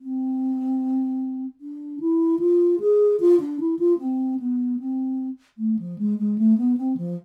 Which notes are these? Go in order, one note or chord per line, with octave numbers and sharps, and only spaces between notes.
C4
D4
E4
F4
G#4
F4
D4
E4
F4
C4
B3
C4
A3
F3
G#3
G#3
A3
B3
C4
F3